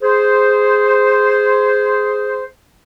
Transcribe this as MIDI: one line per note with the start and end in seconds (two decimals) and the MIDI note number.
0.02 2.44 68
0.02 2.44 72